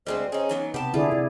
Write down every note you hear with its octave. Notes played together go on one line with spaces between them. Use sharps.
D2 G3 G#3 C4 C5
C#4 D#4 G#4
E3 F#3 B3 D#4
C3 B3 G4 A5
D3 E4 F4 G#4 D5
C3 D5